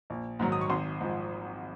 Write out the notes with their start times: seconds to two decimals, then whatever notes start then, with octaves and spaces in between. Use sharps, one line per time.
0.10 A#1
0.39 G#2 D#3 F#3
0.52 D#6
0.61 C#6
0.70 G#1 C6
1.01 G#2 F3